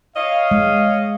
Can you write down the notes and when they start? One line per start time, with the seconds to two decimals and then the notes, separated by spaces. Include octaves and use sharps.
0.16 C#5 D#5 F5
0.51 G#3